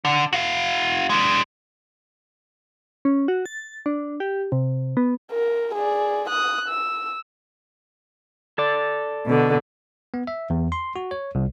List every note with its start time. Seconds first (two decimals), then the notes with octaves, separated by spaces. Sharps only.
0.05 D3
0.33 F#4 F5
1.10 G#3 D4
3.05 C#4
3.28 F#4
3.46 A6
3.86 D4
4.20 G4
4.52 C3
4.97 B3
5.31 A#4
5.75 G#4 D5
6.29 D#6 F#6
6.68 E6
8.58 A4 D5
9.25 B2 D3
10.14 B3
10.27 E5
10.50 E2
10.72 C6
10.96 F#4
11.11 C#5
11.35 C2